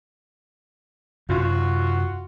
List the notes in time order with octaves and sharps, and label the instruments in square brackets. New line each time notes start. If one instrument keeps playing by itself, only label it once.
[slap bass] F#2 C3 [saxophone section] F4 F#4